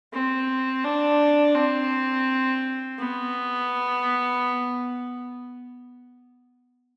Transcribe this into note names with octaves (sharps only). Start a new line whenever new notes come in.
C4
D4
C4
B3